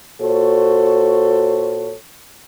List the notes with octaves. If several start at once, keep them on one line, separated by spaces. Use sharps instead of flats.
A#2 F#4 A4 C5 C#5